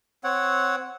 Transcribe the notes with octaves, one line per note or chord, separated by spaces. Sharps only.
C4 C#5 F#5